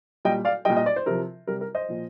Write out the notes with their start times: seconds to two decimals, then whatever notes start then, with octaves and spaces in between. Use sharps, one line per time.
0.25 A#2 G3 D#5 G5
0.45 D5 F5
0.65 A#2 G3 D#5 G5
0.76 D#5
0.86 D5
0.96 C5
1.06 C3 F3 A#4
1.47 C3 G3 A#4
1.61 A#4
1.75 C5 D#5
1.88 A#2 F3